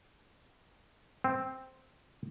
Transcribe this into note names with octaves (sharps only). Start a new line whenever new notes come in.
C4